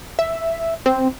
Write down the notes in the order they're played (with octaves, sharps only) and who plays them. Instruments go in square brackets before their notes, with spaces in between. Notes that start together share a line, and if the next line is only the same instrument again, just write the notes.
[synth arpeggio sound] E5
C4